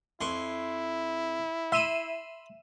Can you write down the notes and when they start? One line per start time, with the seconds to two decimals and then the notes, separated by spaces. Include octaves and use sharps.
0.21 F2 E4 C6 C#6
1.72 E5 B5 C6 D#7 E7